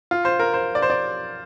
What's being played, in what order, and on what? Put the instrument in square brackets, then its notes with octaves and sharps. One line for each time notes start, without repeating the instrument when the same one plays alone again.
[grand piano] F4
C5
A#4
C5
D5
C5
D5